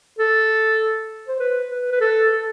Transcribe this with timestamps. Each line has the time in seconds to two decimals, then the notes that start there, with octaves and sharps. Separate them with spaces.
0.19 A4
1.28 C5
1.39 B4
1.70 B4
1.92 B4
2.01 A4
2.31 A4